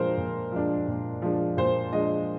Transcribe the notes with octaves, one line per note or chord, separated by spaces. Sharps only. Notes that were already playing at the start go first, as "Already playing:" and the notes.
Already playing: A#2 F3 G#3 D4 A#4 C5
A#2
F3 G#3 D4
A#2
F3 G#3 D4
A#2 C5
F3 G#3 D4 D#5